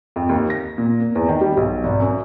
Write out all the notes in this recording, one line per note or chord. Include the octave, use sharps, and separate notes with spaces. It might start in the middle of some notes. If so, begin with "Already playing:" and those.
F2
D#2
A#6
A#2
A#3
E2
D#3
G3
B1
G#1
F#2